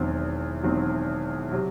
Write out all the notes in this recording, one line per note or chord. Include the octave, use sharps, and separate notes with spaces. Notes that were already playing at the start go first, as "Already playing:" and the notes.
Already playing: E1 E2 D#3 F#3 C4
E1 E2 D#3 F#3 C4
C3 F#3